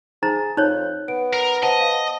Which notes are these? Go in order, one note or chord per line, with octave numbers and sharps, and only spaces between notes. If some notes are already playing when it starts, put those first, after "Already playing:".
D#4 G#4 C5 A#5 A6
F2 D#4 C#5 F#6
B3 D7
A#4
C5 D#5 F#5 A5
F5